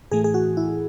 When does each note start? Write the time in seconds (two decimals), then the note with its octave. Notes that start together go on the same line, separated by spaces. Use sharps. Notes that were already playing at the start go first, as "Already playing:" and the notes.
0.12 A2 E3 A3 G#4
0.24 G#4
0.34 F#4
0.57 E4